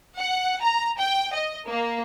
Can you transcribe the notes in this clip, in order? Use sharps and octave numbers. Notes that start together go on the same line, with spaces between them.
F#5
A#5
G5
D#5
A#3